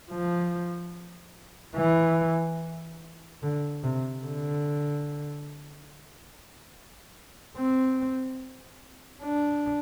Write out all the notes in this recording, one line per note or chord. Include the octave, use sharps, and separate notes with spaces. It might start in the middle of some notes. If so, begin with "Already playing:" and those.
F3
E3
D3
C3
D3
C4
D4